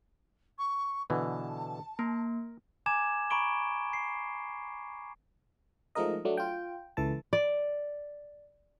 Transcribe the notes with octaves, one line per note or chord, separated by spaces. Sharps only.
C#6
B2 D3 E3 A5
A#3 A#4
G#5 A#5 D6 G#6 E7
A#5 B5 C#6 D7 G7
C7
F3 G#3 A3 D#4 A#4 D#5
F#3 A3 D4
F4 G5
C#2 E3 A4 A5
D5